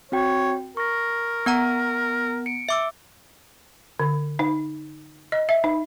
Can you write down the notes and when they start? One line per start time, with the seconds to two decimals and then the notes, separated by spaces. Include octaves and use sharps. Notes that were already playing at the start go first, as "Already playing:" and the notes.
0.12 C4 F#4 C#5 G5
0.77 A#4 C#6 A#6
1.46 B3 F#5 A#5
2.46 C#7 D7
2.69 E5 D6 E6
4.00 D3
4.39 D#4
5.32 D#5
5.49 E5
5.64 D#4